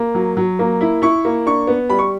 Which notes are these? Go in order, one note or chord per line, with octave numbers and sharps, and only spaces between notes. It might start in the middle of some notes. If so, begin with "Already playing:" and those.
Already playing: A#3
F#3
F#3
A#3
E4
E4 C#6
A#3
D4 C#6
B3
G3 B5
C#6